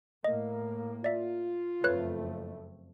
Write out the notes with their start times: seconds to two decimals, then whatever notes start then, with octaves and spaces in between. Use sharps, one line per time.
0.24 A2 A#3 D#5
1.04 F4 D5 E5
1.84 F#1 F2 A3 B4 C#5 F#6